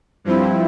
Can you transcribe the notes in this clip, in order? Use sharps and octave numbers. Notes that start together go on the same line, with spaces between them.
G2 F3 C4 E4